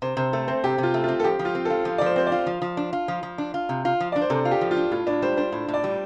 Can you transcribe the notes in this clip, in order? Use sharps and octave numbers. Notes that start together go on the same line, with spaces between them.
C3 C5
C3 C5
A3 A4
C4 C5
C3 G4
C3 F4
A3
C4 F4
A4
F3 G4
F3
F4
C4
F4 A4
F3
D5
F3 C5
C4 C5
D5
F4
F3
F3
D4
F4
F3
F3
D4
F4
C3
F4
F3
D4 D5
C5
C3 A4
F4
G4
F3
F4
D4
A2 F4
A2 D4
G3 C5
D4 C5
A2
A2
D5
G3